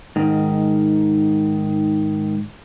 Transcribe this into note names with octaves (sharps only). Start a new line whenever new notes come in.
G#2 D#3